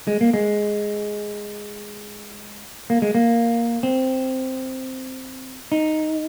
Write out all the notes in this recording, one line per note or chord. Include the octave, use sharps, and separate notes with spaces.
G#3
A#3
G#3
A#3
G#3
A#3
C4
D#4